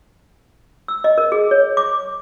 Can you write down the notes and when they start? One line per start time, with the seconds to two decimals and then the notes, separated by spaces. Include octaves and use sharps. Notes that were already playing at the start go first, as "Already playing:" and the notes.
0.88 E6
1.04 D#5
1.18 A#4
1.32 G#4
1.51 C#5
1.77 D6